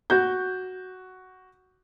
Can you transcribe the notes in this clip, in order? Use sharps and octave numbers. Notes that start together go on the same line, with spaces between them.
F#4 G6